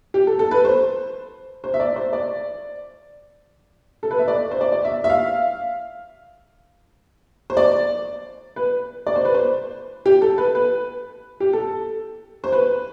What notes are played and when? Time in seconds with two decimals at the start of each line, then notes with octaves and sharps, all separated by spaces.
0.14 G4
0.27 A4
0.39 A4
0.51 B4
0.65 C5
1.64 C5
1.74 E5
1.80 D5
1.96 C5
2.13 D5
4.03 A4
4.11 B4
4.19 E5
4.28 D5
4.51 C5
4.61 D5
4.72 D5
4.85 E5
5.04 E5
5.10 F5
7.50 C5
7.57 D5
8.56 B4
9.07 D5
9.16 C5
9.25 B4
9.34 C5
10.06 G4
10.22 A4
10.38 B4
10.55 B4
11.40 G4
11.53 A4
12.44 C5
12.52 B4